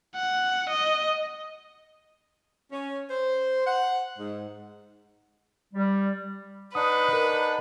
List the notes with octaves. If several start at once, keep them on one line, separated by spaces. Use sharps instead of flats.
F#5
D#5
C#4
C5
F#5
G#2
G3
D4 D#4 B4 F#5 D#6
A#4